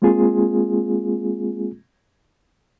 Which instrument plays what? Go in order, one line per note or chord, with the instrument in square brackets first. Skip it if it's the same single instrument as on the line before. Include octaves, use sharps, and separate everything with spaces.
[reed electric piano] G#3 A#3 C4 F4 G#4